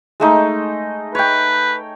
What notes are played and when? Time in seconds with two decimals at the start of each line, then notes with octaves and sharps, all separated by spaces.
0.20 G#3 A3 D#4
1.15 B4 C#5 G5